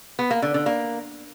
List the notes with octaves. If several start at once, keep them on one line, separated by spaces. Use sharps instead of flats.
B3
A#3
D3
D3
A#3